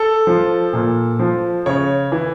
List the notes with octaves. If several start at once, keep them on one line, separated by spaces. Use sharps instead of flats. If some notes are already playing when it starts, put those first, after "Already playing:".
Already playing: A4
F3
A#2
F3
C#3 C#5
E3